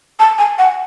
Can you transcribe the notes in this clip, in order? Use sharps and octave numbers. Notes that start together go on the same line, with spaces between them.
A5
G#5
F#5